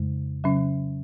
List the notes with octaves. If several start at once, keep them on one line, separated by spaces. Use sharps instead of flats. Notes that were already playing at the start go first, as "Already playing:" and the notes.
Already playing: F2 C#3 G#3
C#3 F#3 C#4